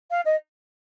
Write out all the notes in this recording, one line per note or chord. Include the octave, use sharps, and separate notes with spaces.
F5
D#5